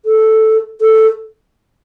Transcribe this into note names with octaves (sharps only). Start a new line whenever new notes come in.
A4
A4